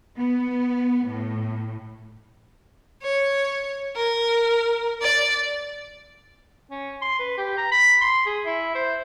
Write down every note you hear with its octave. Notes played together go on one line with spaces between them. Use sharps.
B3
A2
C#5
A#4
D5
C#4
C6
B4
G4
A#5
B5
C6
G#4
E4
C5